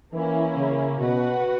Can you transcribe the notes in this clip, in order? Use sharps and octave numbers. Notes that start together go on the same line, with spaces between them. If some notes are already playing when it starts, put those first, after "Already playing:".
E3 A#3 C#4 E4
C#3
B2 F#4 B4 F#5